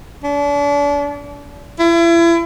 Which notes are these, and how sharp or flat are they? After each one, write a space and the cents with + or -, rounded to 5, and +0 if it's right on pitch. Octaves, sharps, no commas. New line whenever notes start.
D4 -35
E4 +35